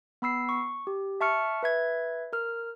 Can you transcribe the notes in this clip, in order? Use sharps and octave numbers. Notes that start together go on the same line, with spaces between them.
B3 B5 E6 C7
C#6
G4
E5 A5 C#6 F6 C#7
B4 E5 G#6
A#4 F6